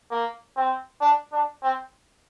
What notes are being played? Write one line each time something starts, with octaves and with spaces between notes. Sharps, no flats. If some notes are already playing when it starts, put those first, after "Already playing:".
A#3
C4
D4
D4
C4